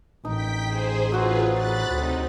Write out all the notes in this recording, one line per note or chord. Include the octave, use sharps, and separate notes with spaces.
A1 D#4 G5 B6
G#4 C5
F#3 F4 F#4 G#4 B4 C5
B5 F#6 A6
D2 C3 D#4